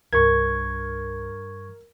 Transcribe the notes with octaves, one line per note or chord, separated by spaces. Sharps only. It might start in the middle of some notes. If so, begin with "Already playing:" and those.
C2 G2 A#4 C#6 G#6